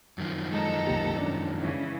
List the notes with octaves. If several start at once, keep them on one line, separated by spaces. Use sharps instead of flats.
F#2 D#3 F3
G#3 A4 D#5 A#5
C2 A#3 G4
C#4 D4 D5
C#3 E3